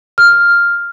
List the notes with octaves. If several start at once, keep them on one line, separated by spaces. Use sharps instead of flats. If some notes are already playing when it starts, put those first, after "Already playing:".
F6